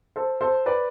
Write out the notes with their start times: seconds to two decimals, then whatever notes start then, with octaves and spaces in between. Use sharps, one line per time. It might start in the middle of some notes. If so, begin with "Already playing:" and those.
0.16 A4 C5
0.41 A4 C5
0.66 B4 D5